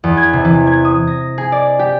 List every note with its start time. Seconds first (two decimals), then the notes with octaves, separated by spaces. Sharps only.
0.04 E2
0.17 G#6
0.33 C3
0.45 E3
0.67 G#6
0.85 D#6
1.07 A#6
1.38 G#4
1.52 D5
1.79 G4